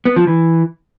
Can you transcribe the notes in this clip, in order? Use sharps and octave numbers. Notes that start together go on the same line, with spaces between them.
B3
F3
E3